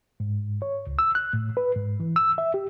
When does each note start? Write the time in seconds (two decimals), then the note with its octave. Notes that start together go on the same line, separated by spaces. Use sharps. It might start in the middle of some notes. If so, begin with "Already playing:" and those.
0.20 G#2
0.62 C#5
0.87 C#2
0.99 E6
1.15 F#6
1.33 A2
1.57 B4
1.76 G#2
2.00 E3
2.16 E6
2.38 E5
2.54 G4